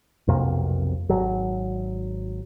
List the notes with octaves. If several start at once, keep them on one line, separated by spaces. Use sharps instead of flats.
B1 F2 C3 A#3
G#1 F#3